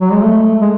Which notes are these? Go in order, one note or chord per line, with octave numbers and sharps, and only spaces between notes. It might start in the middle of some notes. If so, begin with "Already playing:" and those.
F#3
G#3
A3
G#3